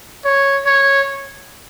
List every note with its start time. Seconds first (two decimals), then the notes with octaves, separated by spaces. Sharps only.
0.25 C#5
0.65 C#5